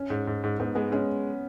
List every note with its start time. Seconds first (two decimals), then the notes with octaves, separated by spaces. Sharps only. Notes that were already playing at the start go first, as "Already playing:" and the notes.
Already playing: C#4
0.10 G#2
0.27 G#2
0.44 G#2
0.59 G#2 B3
0.75 G#3 B3
0.92 G#3 C#4